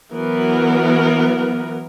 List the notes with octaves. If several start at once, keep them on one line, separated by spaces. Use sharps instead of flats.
E3 F#3 B3 A#4